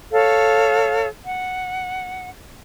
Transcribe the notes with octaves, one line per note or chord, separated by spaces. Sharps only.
A4 C#5 F5
F#5